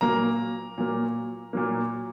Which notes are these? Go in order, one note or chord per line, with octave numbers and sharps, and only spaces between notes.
A#2 F#3 A#3 A#5
A#2 F#3 A#3
A#2 F#3 A#3